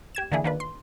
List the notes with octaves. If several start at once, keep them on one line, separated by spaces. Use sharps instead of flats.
G4 G#6 E7
D3 E3 A#3 D4 E4 G#4
D#3 A#3 D4 F4 B4
C6